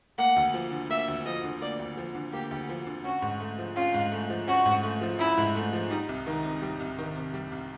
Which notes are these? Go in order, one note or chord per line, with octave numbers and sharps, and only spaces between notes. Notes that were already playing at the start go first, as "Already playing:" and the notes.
A#3 F#5
D2
F3
D3
A#3 E5
D2
F3 D#5
D3
A#3 D5
D2
F3
D3
A#3 G4
D2
F3
D3
C#4 F#4
G#2
A3
F3
C#4 F4
G#2
A3
F3
C#4 F#4
G#2
A3
F3
C#4 E4
G#2
A3
F3
G3 D#4
C2
D#3 D#4
C3
G3
C2
D#3
C3
G3
C2